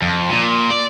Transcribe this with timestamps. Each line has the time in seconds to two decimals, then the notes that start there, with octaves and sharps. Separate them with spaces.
0.02 F2
0.30 A#2
0.71 D5